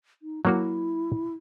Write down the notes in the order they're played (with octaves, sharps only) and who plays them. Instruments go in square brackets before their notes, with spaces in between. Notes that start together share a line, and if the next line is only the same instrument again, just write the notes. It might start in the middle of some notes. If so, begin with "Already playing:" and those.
[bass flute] D#4
[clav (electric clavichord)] F#3 A#3 F#4 [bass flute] E4